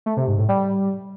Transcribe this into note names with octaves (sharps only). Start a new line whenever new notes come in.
A3
C3
G#2
A2
G3